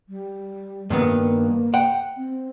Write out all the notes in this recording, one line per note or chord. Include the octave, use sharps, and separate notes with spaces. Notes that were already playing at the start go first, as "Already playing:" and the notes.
G3
G2 D#3 A#3 B3
F#5 G5
C4